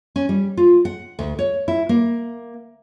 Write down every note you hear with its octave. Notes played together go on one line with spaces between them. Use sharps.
C#4
G3
F4
F#5
D2
C#5
E4
A#3